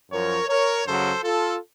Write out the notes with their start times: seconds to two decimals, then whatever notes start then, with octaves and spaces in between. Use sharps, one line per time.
0.11 F#2 F3 A#4 C#5
0.48 A#4 C#5
0.85 F#2 C#3 F#3 A4 C5
1.22 F4 A4